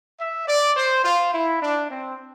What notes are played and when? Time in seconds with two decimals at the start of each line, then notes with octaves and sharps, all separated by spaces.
0.20 E5
0.48 D5
0.76 C5
1.05 F4
1.34 E4
1.63 D4
1.91 C4